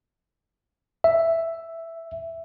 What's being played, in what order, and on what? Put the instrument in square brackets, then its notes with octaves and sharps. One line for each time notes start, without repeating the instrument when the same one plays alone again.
[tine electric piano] E5